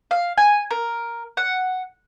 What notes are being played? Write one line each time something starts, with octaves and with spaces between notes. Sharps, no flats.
F5
G#5
A#4
F#5